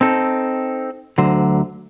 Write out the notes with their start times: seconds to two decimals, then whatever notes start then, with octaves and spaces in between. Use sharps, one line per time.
0.01 C4 D#4 A4
1.18 D2 D3 F#3 C5